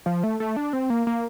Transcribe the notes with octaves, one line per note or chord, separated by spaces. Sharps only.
F3
A3
A3
D4
C4
A#3
A#3